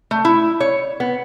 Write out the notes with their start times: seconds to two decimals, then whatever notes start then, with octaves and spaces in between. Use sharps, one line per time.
0.11 A3
0.25 E4
0.60 C#5
1.00 B3